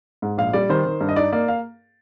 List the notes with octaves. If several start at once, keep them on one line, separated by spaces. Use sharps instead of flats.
G#2
A#1 F5
G3 D5
D#3 C5
D#3
G2
D#5
D#4 D5
A#3 D5
F5